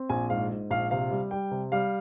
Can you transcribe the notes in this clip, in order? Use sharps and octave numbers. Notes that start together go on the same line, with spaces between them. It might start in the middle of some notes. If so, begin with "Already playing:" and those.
Already playing: C4
A#1 G#5
G#2 F5
G#2
A#1 F5
C3 F5
G3
G3 G5
C3
G3 F5